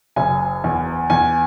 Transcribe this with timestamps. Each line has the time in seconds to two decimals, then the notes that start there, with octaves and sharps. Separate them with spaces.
0.16 F#1 G#5
0.64 E2
1.10 E2 G#5